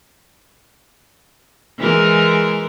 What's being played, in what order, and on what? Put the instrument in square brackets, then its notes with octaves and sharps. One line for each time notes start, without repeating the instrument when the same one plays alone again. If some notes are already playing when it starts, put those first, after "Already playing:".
[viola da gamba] E3 G#3 A#4